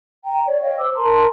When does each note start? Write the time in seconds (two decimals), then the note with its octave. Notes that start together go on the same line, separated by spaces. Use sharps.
0.24 G5 A#5
0.46 C#5 D5
0.61 C#5 D#5 F5 G5
0.78 C5 D6 E6
0.95 A#4 A5 A#5 C6